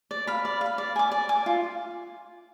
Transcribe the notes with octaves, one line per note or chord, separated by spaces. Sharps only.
D5
F5 B5
D5
F5 B5
D5
G#5 D6
D5
G#5 D6
F4